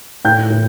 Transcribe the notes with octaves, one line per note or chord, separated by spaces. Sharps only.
A2 G5 G6
A2